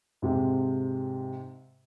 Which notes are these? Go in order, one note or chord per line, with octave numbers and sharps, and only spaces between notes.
G#2 C3